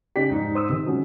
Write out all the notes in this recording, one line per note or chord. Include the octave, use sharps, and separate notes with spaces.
C#3 D#4 G4 D5 B6
F2 G#2 D#4
C5 D#6 E6
C3 D#3
F#3 G#3 C#4